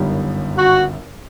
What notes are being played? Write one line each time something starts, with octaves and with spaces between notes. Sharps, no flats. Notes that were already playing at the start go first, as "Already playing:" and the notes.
Already playing: G1 F#2 D#3 G3
F#4